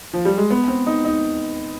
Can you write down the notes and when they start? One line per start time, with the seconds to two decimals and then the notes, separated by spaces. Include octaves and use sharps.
0.13 F3
0.25 G3
0.37 G#3
0.50 B3
0.68 C4
0.87 D#4
1.05 D#4